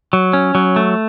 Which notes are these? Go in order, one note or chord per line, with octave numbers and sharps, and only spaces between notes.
F#3
C#4
F#3
A3